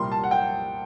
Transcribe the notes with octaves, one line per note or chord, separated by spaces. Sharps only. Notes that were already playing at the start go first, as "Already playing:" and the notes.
Already playing: C2 A#2 G3 A#3 C6
A5
F#5
G5